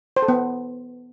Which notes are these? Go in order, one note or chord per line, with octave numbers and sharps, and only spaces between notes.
C5
A4
B3